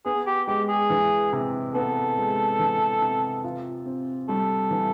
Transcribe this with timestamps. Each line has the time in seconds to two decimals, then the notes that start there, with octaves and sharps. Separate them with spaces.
0.05 B3 G#4
0.27 G4
0.47 G#3 G4
0.69 G#4
0.90 E3
1.33 C3
1.74 B3 A4
2.17 G#3
2.59 E3
3.02 C3
3.44 F4
3.86 C4
4.29 G3 A4
4.71 E3